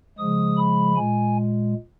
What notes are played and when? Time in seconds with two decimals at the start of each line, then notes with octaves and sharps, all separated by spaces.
0.18 C#3 F3 G#3 D#6
0.57 B5
0.97 A#2 G#3 G#5